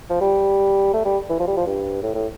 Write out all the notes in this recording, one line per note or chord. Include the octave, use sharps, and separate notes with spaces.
F3
G3
A3
G3
E3
F3
G3
F3
G2
A2
A2